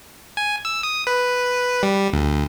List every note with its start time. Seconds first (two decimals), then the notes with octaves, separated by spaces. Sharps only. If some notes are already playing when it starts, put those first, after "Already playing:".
0.37 G#5
0.65 E6
0.83 D#6
1.07 B4
1.83 G3
2.13 D2